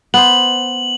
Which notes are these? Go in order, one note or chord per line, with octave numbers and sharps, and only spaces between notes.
B3 C5 F#7